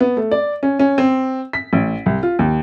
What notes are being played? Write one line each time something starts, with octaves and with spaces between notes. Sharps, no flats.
B3
A3
D5
C#4
C#4
C4
B6
A1
C2
F4
D#2